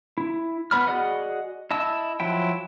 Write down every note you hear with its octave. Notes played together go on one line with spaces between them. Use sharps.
E4
B3 B5 F6
F#4 G#4 D5 D#5 F#5
E4 D#5 A5 E6
F3 F#3 E4 G5